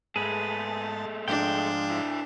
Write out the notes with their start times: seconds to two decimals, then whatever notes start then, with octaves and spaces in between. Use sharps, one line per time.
0.16 G#2 G#3 A3 G#4 B4 A5
1.28 G#2 F3 D4 G5
1.90 D3 E4